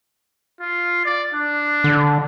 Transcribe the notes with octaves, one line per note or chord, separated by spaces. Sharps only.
F4
D5
D4
D3